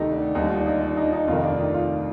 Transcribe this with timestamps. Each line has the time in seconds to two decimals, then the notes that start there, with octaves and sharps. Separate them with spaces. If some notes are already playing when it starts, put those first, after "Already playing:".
Already playing: D2 C3 D#3 A3 D#4 G4 A4
0.12 D4
0.35 D#2 D3 G3 D#4
0.50 F4
0.60 D4
0.66 D#4
0.81 D4
0.97 D#4
1.13 D#4
1.28 F2 C3 D#3 A3 F4
1.44 D4
1.59 D#4
1.74 F4